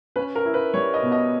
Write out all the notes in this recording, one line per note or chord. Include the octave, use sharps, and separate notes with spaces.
C#4 B4
A#4
E4
B4
G3 C#5
D#5
B2
D#5